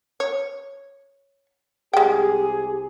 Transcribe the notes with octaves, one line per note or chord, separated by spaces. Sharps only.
C#5
C2 G#3 G4 G#4 G5